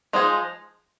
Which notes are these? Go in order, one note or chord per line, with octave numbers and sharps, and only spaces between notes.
F3 G#3 D#4 G#4